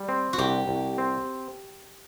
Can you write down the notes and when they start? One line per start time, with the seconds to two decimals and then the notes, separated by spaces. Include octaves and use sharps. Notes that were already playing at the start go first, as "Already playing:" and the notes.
Already playing: G3
0.09 C4
0.33 F#4
0.38 C2 G4
0.68 C2
0.98 C4